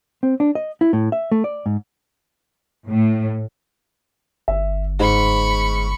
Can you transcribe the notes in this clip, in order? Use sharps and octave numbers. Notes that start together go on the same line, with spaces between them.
C4
D4
D#5
E4
A2
E5
A3
D5
G#2
A2
G1 E5
G#2 B5 C#6